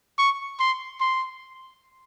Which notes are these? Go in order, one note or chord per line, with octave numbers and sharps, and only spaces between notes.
C#6
C6
C6